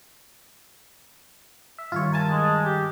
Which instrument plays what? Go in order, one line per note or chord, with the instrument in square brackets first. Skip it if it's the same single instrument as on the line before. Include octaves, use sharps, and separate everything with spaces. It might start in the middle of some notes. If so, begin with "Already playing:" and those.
[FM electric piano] E5
[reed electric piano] G2 D#3 G3 [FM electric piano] F4 C#5
[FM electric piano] A#4 G#5 A5
[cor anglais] G#3
G4